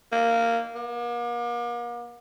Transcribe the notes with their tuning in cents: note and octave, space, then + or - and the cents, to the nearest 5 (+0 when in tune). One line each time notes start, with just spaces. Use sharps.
A#3 -10
A#3 +40